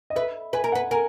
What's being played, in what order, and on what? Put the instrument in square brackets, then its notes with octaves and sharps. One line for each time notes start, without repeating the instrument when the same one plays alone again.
[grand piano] D#5
[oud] B4 [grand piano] E5
[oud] B4 [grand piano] G#5
[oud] A#4
[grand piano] F#5
[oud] B4
[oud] A#4 [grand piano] G#5